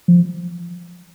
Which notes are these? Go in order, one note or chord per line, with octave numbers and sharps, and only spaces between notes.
F3